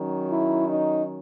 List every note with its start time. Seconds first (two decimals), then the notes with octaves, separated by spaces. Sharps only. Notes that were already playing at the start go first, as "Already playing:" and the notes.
Already playing: D#3 F#3 C#4
0.28 E4
0.66 D#4